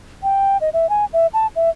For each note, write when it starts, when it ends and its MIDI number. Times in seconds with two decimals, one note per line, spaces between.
0.23 0.57 79
0.61 0.69 75
0.73 0.89 76
0.89 1.05 80
1.13 1.27 76
1.34 1.47 81
1.56 1.70 76